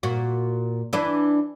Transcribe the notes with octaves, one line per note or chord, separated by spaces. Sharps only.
A#2 F#4
E3 D4 B4